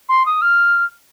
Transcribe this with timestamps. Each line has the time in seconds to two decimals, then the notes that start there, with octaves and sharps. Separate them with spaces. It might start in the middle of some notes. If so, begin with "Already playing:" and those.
0.09 C6
0.26 D#6
0.42 F6